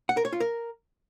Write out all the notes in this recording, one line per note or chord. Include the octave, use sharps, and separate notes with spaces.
F#5
A#4
C#5
F4
A#4